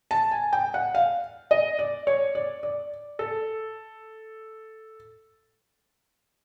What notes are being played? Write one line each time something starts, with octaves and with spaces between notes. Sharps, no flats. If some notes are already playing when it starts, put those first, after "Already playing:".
A5
G#5
G5
F#5
F5
D#5
D5
C#5
D5
D5
A4